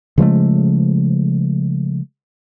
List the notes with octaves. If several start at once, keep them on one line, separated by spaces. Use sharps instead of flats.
C#3 F3 G#3 A3